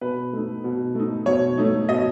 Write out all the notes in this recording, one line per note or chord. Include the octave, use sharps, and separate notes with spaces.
B2 B4
A3 D#4
B2
A3 D#4
B2 C#5
A3 D#4
B2 D#5